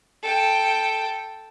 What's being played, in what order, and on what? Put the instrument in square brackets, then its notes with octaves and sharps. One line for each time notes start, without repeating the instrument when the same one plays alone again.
[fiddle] A4 G5